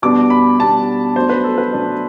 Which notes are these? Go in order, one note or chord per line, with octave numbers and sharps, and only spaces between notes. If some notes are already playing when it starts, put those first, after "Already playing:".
B2 G3 B3 D4 D6
B5
B2 G3 B3 D4 A5
B2 F#3 A3 D4 C5
B4
A4
B4
B2 F#3 A3 D4